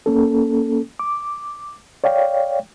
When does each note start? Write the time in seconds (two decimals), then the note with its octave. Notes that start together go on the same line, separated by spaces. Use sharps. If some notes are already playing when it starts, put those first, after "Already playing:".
0.06 A#3 C#4 A4
0.99 D6
2.04 C#5 D5 F5 G5